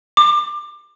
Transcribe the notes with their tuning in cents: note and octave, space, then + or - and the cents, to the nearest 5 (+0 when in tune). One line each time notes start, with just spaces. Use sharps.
D6 +25